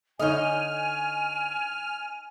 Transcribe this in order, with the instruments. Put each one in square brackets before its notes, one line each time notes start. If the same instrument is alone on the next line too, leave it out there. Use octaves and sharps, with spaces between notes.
[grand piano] D3 C#5 [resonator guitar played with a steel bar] D#4 D#5 [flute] G#5 [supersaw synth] F6